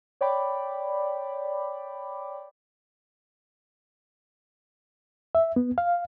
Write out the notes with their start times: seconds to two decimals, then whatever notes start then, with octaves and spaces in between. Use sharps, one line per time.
0.21 C#5 D5 G5 B5 D6
5.35 E5
5.56 B3
5.78 F5